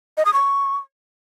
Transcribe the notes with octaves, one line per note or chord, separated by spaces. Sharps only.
D#5
D#6
C#6